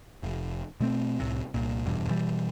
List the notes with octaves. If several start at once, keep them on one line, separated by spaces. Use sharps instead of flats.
F1
B2 A3 C4
C2 A2 C3
C2 A#2
D#1 E2 G2 B2
B2 E3 G3